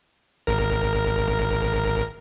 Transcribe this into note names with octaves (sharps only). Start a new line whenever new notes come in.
G#1 A#4